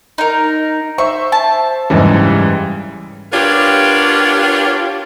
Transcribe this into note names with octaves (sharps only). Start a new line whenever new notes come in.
D#4 A#4
C5 E5 C#6
A5
F#1 G#2 C#3 E3 G3
B3 D4 F4 G4 A#4 C#5